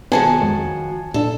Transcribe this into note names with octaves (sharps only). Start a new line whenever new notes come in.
D#3 F3 F#3 B3 C4 G#4 G#5 A5
F2 G#3
A#2 D4 A4